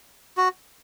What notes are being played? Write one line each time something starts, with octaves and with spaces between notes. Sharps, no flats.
F#4